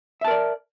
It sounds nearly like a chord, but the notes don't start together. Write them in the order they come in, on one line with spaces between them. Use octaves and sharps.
E5 A5 A#4 D5